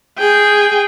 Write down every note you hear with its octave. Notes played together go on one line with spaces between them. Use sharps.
G#4 G5